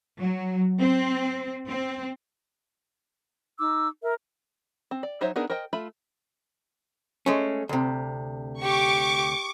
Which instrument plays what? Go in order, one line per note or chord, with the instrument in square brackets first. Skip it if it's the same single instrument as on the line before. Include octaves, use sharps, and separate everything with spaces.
[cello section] F#3
C4
C4
[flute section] D#4 D6 E6
A#4 E5
[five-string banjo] C4
D5
F#3 D#4 C5 C#5 E5
B3 D4 D#4 G#4 A#4
A#4 C5 D#5 G5
A3 F4 E5 B5
[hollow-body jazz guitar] G#3 A3 C#4
D2 C3
[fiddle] G4 [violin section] C#6 D6